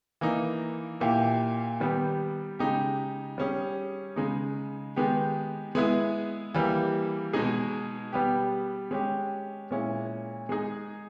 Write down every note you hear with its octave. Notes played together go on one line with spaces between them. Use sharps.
E3 A#3 D#4
A#2 A#3 E4 G4
D#3 G3 B3
C#3 G#3 D#4 G4
G3 C#4 G#4
C#3 G#3 D#4
D#3 G#3 B3 G4
G#3 B3 E4 G#4
E3 G3 A#3
B2 G#3 D#4 G#4
G3 B3 G4
G#3 C#4 G4
A#2 G#3 C#4 E4
G#3 D#4 G#4